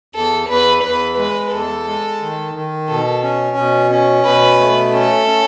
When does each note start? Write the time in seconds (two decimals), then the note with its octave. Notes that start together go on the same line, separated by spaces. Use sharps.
0.15 E2 A4
0.49 E2 B4
0.83 E2 B4
1.17 G#3 B4
1.52 E2 A4
1.86 G#3
2.21 D#3
2.54 D#3
2.88 B2 A4
3.22 C#4
3.57 B2
3.91 C#4
4.25 B2 B4
4.60 A3
4.93 C#4 A4
5.27 C#4